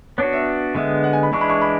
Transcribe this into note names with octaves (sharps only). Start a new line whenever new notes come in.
B3 D4 F#4 C#5
E5
D3 G#3 B3 E5
F#5
G#5
B5
E3 G#3 D4 C#6
B5
C#6
B5